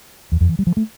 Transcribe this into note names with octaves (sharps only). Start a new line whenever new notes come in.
E2
F2
E3
G3
F3
A3